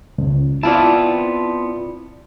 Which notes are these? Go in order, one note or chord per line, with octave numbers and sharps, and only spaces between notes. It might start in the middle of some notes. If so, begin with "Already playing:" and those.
C#2
B3 C4 E4 F4 D5 A5